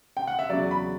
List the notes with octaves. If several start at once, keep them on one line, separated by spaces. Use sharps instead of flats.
G5
F#5
E5
E2 C#3 F#3 D5
B5